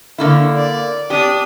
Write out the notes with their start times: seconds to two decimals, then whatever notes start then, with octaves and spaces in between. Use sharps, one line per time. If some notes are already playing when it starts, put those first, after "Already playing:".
0.18 D3 A#3 E4
0.57 D5
1.10 D4 G4 D#6